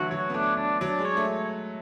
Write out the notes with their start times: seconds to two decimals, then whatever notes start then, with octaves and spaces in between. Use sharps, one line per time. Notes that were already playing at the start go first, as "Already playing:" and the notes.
Already playing: D3 E3 F#3 A3 F#4
0.11 F#3 C#5
0.30 B3
0.34 A3 D4
0.57 D4
0.81 F#3 D4
0.99 G#3
1.05 C#5
1.17 A3